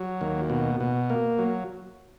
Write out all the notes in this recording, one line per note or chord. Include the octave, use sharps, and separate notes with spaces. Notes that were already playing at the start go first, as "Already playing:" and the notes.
Already playing: F#3
D#2
B2
B2
A#3
F#3